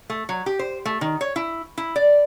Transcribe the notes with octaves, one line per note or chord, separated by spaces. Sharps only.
A3
F#3
G4
C5
A3
D#3
C#5
E4
E4
D5